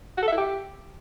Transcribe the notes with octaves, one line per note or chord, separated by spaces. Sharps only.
F#4
A4
E5
E4
G4